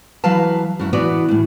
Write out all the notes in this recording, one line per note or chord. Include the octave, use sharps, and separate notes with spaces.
E3 F#3 B4 F5 A5
F#2 F#3 E4
E3 B3 F#4 B4 D5
A2 E3